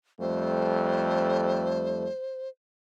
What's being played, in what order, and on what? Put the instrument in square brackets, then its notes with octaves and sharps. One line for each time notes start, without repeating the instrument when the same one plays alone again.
[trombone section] F2 G3 A3 [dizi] C5